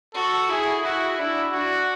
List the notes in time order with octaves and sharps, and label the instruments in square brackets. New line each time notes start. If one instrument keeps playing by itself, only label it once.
[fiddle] F#4 [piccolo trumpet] A4
[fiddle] E4 [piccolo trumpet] G#4
[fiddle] E4 [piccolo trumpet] F#4
[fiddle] D4 [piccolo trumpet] E4
[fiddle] D4 [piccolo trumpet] F#4